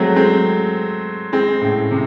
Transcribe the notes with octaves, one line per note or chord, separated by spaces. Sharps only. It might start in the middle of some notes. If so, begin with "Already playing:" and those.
Already playing: F#3 G#3 A3 C4
G#3 C4
G#3 C4
A2 C#3
C3